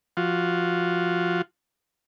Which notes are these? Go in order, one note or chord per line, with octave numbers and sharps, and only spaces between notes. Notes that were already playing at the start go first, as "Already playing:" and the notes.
F3 F4 F#4